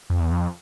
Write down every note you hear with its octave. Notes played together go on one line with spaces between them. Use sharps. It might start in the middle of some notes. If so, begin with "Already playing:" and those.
F2
E2
F2